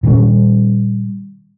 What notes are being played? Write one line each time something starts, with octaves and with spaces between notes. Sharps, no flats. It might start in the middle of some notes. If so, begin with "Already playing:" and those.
A#2 D#3 G3 C#4